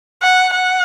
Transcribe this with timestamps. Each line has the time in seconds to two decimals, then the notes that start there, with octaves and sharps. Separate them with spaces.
0.22 F#5
0.54 F#5